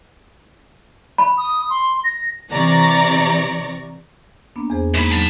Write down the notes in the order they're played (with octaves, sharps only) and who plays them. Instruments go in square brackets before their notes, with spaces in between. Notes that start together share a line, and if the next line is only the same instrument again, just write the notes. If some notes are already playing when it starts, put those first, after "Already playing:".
[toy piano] B5
[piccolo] D#6
C6
A#6
[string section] C3 E3 D5 A#5 C#6 A#6
[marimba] A#3 B3 D4
E2 G#4 C5
[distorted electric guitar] F#2 B5 [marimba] G#3 A#3 D#4
[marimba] F#3 A3 D#4 [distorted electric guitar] A5 B5